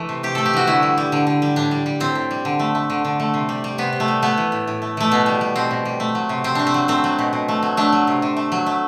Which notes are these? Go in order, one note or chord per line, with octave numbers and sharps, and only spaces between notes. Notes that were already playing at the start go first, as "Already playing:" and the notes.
Already playing: E3 A3
C3
C3 G4
A3 A4
G4
E3 F#4
D3 E4
G3
G3
D3
D3
G3
A2 D4
G3
G3
A2 C4
A2
G3
D3
A3
A3
D3
D3
A3
C3
G3
G3
C3 B3
C3
A3
G3
A3 B3
E3
A2
A2
A3
E3 A3
B2 B3
G3
G3
B2 C4
B2
G3
A3
F#3
C3
C3 C4
A3 D4
C4
F#3
A3 C4
F#3
B2
B2
A3
F#3
A3 D4
F#3
C3
C3
A3
F#3
A3